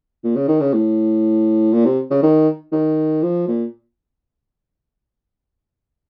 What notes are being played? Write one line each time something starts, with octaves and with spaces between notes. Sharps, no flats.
A#2
C#3
D#3
C#3
A2
A#2
C3
C#3
D#3
D#3
F3
A#2